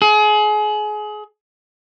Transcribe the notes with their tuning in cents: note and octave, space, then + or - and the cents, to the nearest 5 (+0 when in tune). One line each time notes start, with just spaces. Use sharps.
G#4 +30